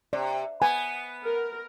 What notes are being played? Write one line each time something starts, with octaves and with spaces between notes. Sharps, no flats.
C3 D5
B3 G#5
A#4